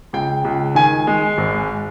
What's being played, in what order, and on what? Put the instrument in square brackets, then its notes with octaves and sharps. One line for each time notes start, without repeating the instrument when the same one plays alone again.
[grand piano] C#2 G5
C#2
D#3 G#5
G#3
G#1